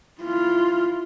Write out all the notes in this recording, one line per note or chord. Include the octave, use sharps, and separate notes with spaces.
E4 F4